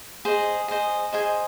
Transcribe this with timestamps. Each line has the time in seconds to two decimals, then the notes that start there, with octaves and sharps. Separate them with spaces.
0.25 G#4 C5 D#5
0.68 G#4 C5 D#5
1.13 G#4 C5 D#5 G#5